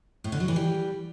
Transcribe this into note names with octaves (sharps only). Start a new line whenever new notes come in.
A2
D3
F#3
E3
G3